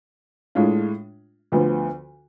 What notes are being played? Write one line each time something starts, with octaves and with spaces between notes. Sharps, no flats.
A2 G#3 D4 F4
D2 D3 F3 B3